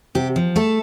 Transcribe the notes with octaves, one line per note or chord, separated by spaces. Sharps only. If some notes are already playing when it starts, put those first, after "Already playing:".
C3 G4
F3
A3 A4